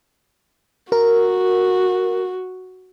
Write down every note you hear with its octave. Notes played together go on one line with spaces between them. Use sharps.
F#4 A#4